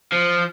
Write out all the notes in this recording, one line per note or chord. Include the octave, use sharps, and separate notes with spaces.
F3